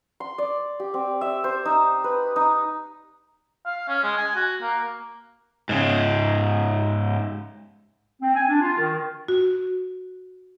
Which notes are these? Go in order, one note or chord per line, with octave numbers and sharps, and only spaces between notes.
C6
D5
G4
C4
E5
C5
D#4
B4
D#4
F5
C#4
G#3
G#5
F#4
A#3
G#2 C#3
C4
G#5
D4
F4
D#3
F#4